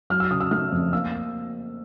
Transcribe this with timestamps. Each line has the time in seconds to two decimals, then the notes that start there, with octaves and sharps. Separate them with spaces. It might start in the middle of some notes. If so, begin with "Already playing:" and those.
0.10 F#3 F6
0.20 E6
0.31 C#3 D#6
0.41 E6
0.51 A3 F6
0.72 F2
0.93 A#3 E6